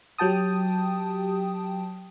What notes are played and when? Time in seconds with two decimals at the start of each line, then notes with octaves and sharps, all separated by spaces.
0.18 F#3 G4 G5 A5 D#6